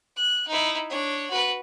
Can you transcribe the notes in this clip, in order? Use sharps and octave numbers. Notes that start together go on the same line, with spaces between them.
F#6
D#4 E4
D4 C#5
F#4 B4